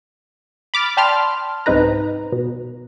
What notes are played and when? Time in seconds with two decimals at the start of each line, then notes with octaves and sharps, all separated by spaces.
0.74 B5 D6 F6 A6
0.97 D5 G5 A5 B5 C6 F6
1.66 C2 G#2 C4 D#4 B4 A#5
2.32 B2